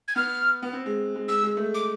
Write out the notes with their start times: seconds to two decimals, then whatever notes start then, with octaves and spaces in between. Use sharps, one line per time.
0.08 G#6
0.16 B3 F6
0.63 B3
0.73 C4
0.86 G#3
1.15 G#3
1.28 G#3 E6
1.43 G#3
1.57 A3
1.74 D6